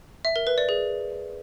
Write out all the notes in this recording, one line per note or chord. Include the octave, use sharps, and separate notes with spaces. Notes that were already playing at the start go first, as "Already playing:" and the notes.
E5
A#4
B4
D5
G#4